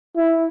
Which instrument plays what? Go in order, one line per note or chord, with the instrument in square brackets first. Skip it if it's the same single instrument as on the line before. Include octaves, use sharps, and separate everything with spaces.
[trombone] E4